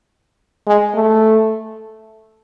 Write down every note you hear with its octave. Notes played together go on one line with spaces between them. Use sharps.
G#3
A3